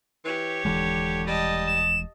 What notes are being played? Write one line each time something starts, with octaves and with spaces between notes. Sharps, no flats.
E3 G4 C#5
D#1 D3 E3 G#3
G3 D#5 A5
E7